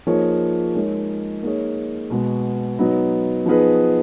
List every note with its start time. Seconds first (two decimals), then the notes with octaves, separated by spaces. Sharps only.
0.07 F3 A#3 D#4 G#4 C#5
0.75 G#3 D#4 A#4 C#5
1.43 A#3 D#4 G#4 C#5
2.10 B2 G#3 B3 F#4
2.79 F#3 B3 D#4
3.46 F3 B3 D#4 G#4 B4